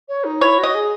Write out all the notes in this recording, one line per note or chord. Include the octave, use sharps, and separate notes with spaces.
C#5
D#4
E4 C#5
F#4
D#5
G#4